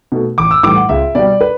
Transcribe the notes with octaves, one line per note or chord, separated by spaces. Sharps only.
B2 A3
A1 D6
E6
A2 E3 G3 D6
F#5
C#2 E5
B2 G3 D5
B4